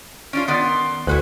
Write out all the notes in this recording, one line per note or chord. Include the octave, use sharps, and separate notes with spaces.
C#4 D4 F4 D7
D#3 B3 D5 C6
D2 E4 F#4 B4